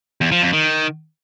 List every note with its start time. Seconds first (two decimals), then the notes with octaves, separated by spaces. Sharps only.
0.21 E2
0.32 F3
0.42 F2
0.53 D#3